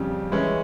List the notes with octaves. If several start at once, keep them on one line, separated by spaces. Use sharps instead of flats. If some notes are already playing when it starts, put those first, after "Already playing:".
Already playing: F2 C#3 G3
E3 G#3 C#4